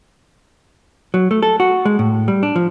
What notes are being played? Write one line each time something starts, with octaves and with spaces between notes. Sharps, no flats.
F#3
A3
A4
F#4
G#3
A2
G3
D4
F3